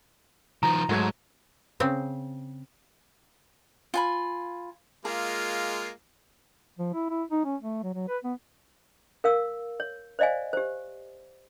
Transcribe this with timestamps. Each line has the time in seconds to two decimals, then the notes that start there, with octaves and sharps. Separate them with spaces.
0.63 D#3 F3 A#5
0.89 G#2 F#3 A3 G#6
1.80 C#3 C4
3.94 F4 G#5 B5
5.05 G#3 A#3 F4 G#4
6.79 F3
6.93 E4
7.10 E4
7.31 D#4
7.44 C#4
7.62 A3
7.83 F#3
7.94 F#3
8.08 B4
8.24 B3
9.24 A#4 F5 E6
9.80 C#5
10.19 C5 D5 D#5 F5 G#5
10.53 G4 C5